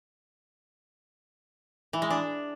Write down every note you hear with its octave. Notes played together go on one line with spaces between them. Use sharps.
E3
G#3
D4